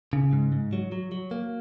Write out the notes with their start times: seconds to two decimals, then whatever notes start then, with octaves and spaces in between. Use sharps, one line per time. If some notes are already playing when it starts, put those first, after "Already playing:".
0.13 C#3
0.33 G#2
0.52 G#2
0.73 F#3
0.92 F#3
1.12 F#3
1.31 A#3